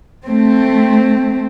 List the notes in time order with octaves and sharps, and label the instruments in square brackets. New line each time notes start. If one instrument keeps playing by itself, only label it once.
[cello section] A3 C4